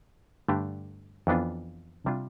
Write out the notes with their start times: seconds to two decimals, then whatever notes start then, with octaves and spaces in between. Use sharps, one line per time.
0.48 G2 D3 A3 D4 G4
1.27 F2 E3 B3 D4 F4
2.06 C3 G3 D4 F4